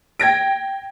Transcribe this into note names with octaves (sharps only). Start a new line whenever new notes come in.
G5 G#6 A#6 D7